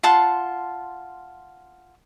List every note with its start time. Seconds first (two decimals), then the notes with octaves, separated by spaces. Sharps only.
0.03 F4 F#5 A5 C6